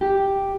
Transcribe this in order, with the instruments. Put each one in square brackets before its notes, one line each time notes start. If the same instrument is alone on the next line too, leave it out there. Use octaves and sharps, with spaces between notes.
[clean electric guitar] G4